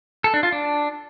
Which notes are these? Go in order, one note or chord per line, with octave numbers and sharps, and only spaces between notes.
A4
D4
F4
D4